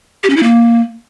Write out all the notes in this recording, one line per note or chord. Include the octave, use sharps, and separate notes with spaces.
G4
C#4
E4
A#3